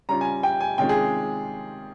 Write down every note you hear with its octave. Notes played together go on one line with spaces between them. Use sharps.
C#3 G3 C#4 F4 A#5
G#5
G5
G#5
C3 D#3 G#3 C#4 F4 G5
G#4